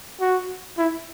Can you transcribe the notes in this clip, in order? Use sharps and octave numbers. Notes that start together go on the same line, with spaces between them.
F#4
E4